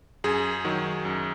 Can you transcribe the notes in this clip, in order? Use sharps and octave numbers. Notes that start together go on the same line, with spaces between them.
F#2 G#4
D#3 F#3
F#2